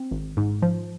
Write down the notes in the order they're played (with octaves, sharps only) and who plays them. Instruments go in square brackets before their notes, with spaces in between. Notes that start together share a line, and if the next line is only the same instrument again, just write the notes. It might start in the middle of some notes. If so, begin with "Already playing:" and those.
Already playing: [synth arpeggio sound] C4
G#1
G#2
F3